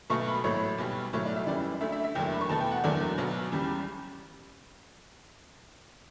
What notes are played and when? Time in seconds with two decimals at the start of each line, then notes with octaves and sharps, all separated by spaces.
0.10 B1 B2 A3 C#6
0.28 B5
0.44 A1 A2 F#3 A3 C#5
0.78 B1 B2 G3
1.13 B1 A2 F#3 A3 C#5
1.26 D5
1.36 E5
1.47 F#2 C#3 E3 G3 D5
1.81 D2 D3 A3 E5
1.92 E5
2.04 E5
2.15 F#1 E2 D3 F#3 A3 G5
2.32 B5
2.41 C#6
2.49 E2 B2 A3 A5
2.60 G5
2.72 F#5
2.84 F#1 E2 D3 F#3 A3 D5
3.18 B1 B2 F#3
3.52 E2 C#3 G3